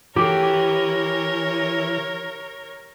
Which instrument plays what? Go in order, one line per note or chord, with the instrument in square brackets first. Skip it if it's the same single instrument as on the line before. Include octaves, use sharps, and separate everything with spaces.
[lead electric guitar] E3 [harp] G4 [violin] A#4 C#5